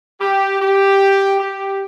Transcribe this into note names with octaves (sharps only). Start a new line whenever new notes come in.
G4
G4
G4